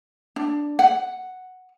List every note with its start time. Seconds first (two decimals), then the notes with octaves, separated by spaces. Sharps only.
0.36 D4
0.79 F#5